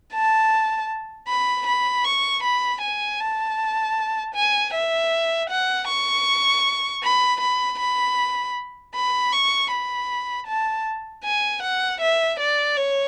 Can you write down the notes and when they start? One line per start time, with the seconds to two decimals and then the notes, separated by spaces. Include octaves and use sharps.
0.13 A5
1.28 B5
1.67 B5
2.05 C#6
2.43 B5
2.82 G#5
3.20 A5
4.35 G#5
4.73 E5
5.50 F#5
5.87 C#6
7.03 B5
7.41 B5
7.79 B5
8.95 B5
9.32 C#6
9.71 B5
10.47 A5
11.24 G#5
11.62 F#5
12.01 E5
12.39 D5
12.77 C#5